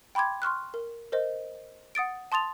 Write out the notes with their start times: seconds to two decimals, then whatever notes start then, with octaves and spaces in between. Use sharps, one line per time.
0.15 G5 B5 C6 D6 G#6
0.42 C6 C#6 F6 F#6
0.74 A#4
1.12 A#4 C5 D#5
1.95 F#5 D#6 A6 D7
2.32 A5 C6 D#6 A6 F7